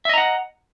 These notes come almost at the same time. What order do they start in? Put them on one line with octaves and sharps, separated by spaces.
E5 D#5 A#5 F#5